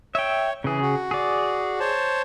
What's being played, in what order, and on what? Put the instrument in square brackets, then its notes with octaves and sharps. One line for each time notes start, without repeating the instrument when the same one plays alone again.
[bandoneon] C#5 [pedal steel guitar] E5 G5
[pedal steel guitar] C#3 G#4 [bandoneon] E3
[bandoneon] F#4
[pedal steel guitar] G#4 D5
[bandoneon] C5 C#5 A5